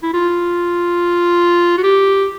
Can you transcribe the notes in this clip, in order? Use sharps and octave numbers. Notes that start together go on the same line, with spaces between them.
E4
F4
F#4
G4